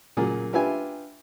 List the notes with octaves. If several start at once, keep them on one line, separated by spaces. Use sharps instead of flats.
A#2 C#3 F#3 G#4
D4 F4 G4 B4 E5 G#5